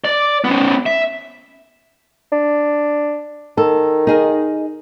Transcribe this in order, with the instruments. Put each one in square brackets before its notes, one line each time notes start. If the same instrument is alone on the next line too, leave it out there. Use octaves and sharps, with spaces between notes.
[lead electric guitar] D5
B3 C#4
E5
[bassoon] D4
[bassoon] D#3 [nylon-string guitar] A4
[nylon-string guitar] D#4 G#4 A#4